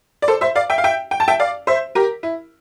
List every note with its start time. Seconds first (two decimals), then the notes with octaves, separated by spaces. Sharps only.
0.22 D5
0.28 A4 C5
0.41 C5 E5
0.55 D5 F5
0.70 E5 G5
0.78 F5
0.84 E5 G5
1.11 G5
1.20 A5
1.28 E5 G5
1.40 D5 F5
1.67 C5 E5
1.95 G4 A#4
2.23 E4